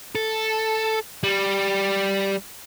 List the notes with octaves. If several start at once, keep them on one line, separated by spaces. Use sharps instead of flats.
A4
G3